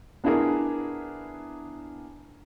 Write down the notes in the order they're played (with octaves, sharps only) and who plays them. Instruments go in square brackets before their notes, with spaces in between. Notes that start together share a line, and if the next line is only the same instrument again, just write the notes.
[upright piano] B3 D4 E4 G#4 A#4